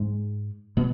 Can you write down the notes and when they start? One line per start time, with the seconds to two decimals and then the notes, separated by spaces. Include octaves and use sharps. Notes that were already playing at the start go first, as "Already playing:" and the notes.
Already playing: G#2 G#3
0.77 B2 B3